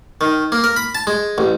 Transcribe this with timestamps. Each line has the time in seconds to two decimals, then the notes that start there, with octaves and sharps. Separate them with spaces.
0.21 D#3
0.52 A#3
0.64 A#4
0.76 B5
0.95 A5
1.07 G#3
1.38 A1